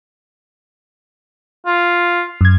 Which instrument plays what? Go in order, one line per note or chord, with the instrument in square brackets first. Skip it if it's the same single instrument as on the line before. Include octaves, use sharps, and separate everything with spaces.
[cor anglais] F4
[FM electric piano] F#2 G#6